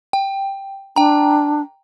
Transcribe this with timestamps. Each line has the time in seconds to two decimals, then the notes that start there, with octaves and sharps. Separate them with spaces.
0.13 G5
0.96 D4 G5 A#5